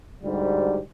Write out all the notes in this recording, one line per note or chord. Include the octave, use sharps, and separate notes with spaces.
D2 G#2 G3